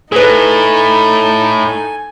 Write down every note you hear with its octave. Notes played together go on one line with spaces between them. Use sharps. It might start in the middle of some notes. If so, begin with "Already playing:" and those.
A2 D#4 G#4 A4 B4 G#5